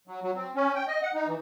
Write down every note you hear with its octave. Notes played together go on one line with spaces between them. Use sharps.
F#3
F#3
C4
C#4
G5
D#5
F#5
D#4
E3